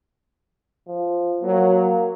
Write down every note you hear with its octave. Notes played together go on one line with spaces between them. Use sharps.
F3
F#3 A#3